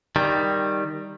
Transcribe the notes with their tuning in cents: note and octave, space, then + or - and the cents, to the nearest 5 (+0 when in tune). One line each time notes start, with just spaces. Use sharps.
D#3 +0 G3 +0